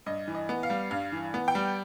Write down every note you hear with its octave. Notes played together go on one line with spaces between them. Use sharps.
G2 D#5
E3
D#5
B3
F5
G3
G2 F5
E3
B3
G5
G3